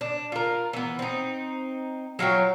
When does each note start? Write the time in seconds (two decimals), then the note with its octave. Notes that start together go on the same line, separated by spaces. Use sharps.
0.01 D4
0.32 F4 A#4
0.73 E3 B3
0.99 C4 D#4
2.19 F#3 F4 C#5 G5